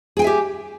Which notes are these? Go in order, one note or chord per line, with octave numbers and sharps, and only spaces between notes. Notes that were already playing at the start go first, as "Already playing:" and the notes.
G4 G#4 E5 G5 G#5